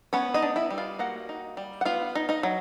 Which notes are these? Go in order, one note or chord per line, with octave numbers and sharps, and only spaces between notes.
B3 C#4 C#5
D#4 D#5
D4
E4 E5
G3
F4 F5
A#3 F#4 F#5
D#4
G3
F#5
B3 F4 F5
D#4
D#4 D#5
F#3